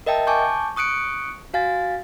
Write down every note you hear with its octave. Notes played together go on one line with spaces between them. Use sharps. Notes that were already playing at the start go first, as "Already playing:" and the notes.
A#4 D#5 E5 G5 A5
G#5 A5 C#6 D6 G6
C#6 D#6 F#6 C#7 D7
F#4 F5 G#5 A6